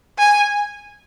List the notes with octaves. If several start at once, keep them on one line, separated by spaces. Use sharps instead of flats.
G#5